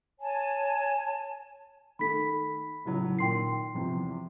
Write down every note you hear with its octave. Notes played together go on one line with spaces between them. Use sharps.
C#5 G#5 A5
D#3 A3 B5 B6
C#2 A2 F#3
A#2 D#3 G5 C6 C7
E2 C3 F3